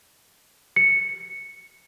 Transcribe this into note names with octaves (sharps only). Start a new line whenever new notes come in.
C#7